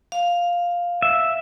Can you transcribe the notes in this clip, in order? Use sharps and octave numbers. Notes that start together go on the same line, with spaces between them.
F5
E5